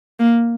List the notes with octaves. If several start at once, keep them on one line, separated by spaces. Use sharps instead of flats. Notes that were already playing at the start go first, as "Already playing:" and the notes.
A#3